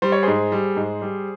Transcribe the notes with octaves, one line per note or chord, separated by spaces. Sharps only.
G3 C5
C#5
G#2 G#4 C5
G3
G#2
G3